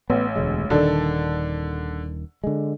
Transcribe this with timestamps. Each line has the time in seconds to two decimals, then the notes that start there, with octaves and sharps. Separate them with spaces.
0.10 A1 B3
0.36 E1 D2 G#3
0.70 D#1 D3 D#3 A4
2.44 D3 G#3